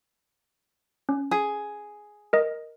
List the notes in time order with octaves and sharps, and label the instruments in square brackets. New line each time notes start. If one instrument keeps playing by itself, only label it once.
[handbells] C#4
[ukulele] G#4
[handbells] A#4 D#5